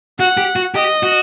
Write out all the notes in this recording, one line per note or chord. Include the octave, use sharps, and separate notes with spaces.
F#4 F#5
G4
F#4
G4 D#5
F#4